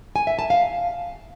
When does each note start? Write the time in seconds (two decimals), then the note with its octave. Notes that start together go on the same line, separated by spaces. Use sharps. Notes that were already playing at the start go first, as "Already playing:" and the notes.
0.16 G#5
0.27 E5
0.39 A5
0.50 F5